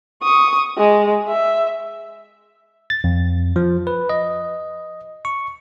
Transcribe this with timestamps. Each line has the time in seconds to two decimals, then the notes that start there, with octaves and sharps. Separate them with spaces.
0.23 C#6 D#6
0.78 G#3
1.28 E5
2.90 A6
3.04 F2
3.56 F3
3.87 B4
4.09 D#5
5.25 C#6